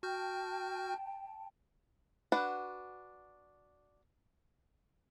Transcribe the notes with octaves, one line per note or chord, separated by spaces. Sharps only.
F#4 G5 A5 F6 G6
D4 F#4 B4 F#5 A5